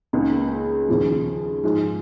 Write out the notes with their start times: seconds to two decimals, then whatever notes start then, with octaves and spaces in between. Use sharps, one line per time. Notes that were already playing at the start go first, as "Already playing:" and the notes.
0.13 C#2 C#3 A#3 D#4
0.89 D#2 C#3 F3
1.63 G#2 F3 G#3